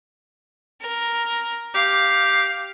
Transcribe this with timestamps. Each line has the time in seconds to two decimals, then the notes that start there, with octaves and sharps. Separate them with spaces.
0.81 A#4
1.75 G4 F5